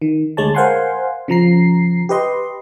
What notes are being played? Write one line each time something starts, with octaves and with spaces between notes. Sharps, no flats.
D#3
D2 G#3 C#5 A5
A#4 C5 F5 F#5 G#5 C6
C#3 F3 A#5 C7
G4 B4 D#5 C6